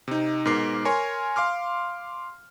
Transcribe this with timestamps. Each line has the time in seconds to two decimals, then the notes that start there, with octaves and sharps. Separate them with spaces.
0.08 C3 D#4
0.45 G#2 B2 A#4 D6 C7
0.85 A#4 C#5 G#5 C6 C#6
1.36 F5 C6 D6 F6